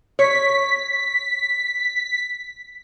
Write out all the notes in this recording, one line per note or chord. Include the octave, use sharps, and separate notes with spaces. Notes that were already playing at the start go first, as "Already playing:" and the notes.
C#5 B6